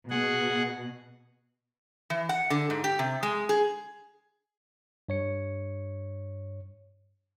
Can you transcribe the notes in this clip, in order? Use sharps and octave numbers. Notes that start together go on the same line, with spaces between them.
B2 G#4 F#5
E3
F#5
D3
G#2
G4
C3
G#3
G#4
G2 C#5 C#7